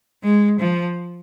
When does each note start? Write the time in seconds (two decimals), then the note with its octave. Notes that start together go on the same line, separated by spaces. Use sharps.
0.23 G#3
0.60 F3